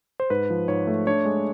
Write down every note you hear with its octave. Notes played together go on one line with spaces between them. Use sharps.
C5
G#2 B4
F3
G#2 C#5
A3
D4 C#5
G#3